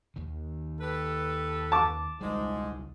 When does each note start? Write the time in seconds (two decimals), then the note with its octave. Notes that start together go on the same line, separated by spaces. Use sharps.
0.16 D#2 D#3
0.80 G4 A4 B4
1.72 A5 D6
2.21 C#2 G#2 G3 G#3